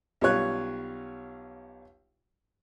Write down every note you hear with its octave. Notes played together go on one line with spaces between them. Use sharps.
B1 G3 C#4 F4 C#5 F#6